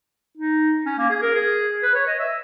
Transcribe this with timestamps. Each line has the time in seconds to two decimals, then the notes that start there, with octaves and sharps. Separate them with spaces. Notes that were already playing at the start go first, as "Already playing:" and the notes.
0.37 D#4
0.86 C#4
0.98 A#3
1.10 G#4
1.22 A#4
1.35 G#4
1.83 B4
1.95 C#5
2.07 D#5
2.19 E5